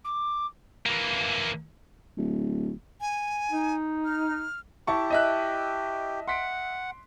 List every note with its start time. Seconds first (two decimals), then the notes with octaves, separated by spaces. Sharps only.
0.04 D6
0.86 E3 A#3
2.17 D1
3.01 G#5
3.51 D#4
4.05 F6
4.87 E4 G4 A5 C#6
5.10 D#5 E5 F#6
6.28 F#5 C6 B6 D7